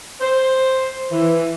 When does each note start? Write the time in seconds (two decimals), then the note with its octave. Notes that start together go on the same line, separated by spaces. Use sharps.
0.20 C5
1.12 E3